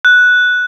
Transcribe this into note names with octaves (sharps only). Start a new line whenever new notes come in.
F#6